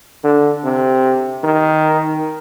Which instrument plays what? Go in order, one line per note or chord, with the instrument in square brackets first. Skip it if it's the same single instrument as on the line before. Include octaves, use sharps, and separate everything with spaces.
[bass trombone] D3
C3
D#3